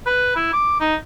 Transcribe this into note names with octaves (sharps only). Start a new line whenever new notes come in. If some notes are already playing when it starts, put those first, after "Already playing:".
B4
E4
D6
D#4